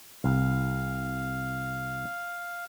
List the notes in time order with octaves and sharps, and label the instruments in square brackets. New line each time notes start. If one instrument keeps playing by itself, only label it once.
[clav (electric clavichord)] C2 [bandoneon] F5